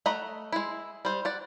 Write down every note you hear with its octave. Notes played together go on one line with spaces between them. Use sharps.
A3 D#5 F#5 A#5 B5
G#3 E4
G3 C5
D5 F#5